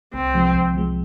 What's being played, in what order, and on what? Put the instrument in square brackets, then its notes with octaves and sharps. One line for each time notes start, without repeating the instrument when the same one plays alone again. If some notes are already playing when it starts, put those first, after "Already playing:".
[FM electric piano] C2 [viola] C4
[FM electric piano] C3 F3 G#3
C2
C3 F3 G#3